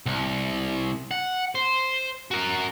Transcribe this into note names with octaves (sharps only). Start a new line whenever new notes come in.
C2
F#5
C5
F#4 A#4